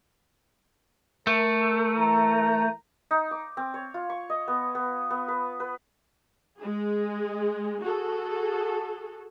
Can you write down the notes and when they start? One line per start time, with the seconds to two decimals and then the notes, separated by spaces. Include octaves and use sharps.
1.27 A3 A#4
1.96 E3 A#4 A#5
3.11 D#4
3.31 D6
3.57 C4
3.74 C#5
3.94 F4
4.10 C#6
4.30 D#5
4.48 B3
4.75 B3
5.10 B3
5.28 B4
5.60 B4
6.58 G#3 G#4
7.84 F#4 G#4 A4